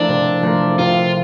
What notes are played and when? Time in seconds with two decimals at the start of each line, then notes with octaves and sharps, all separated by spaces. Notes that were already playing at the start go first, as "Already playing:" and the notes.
Already playing: F3 A3 D4 E4 A#4
0.09 C3
0.42 F3 A3 E4 A#4
0.79 C3 F4